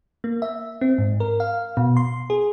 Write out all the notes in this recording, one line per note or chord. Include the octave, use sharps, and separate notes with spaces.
A#3
E5
C4
G#2
A#4
F5
B2
C6
G#4